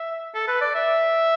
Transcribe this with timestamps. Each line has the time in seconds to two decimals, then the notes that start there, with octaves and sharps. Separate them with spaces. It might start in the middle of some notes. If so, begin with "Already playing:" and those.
Already playing: E5
0.34 A4
0.48 B4
0.61 D5
0.75 E5